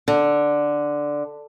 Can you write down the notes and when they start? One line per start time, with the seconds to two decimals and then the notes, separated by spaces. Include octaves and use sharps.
0.08 D3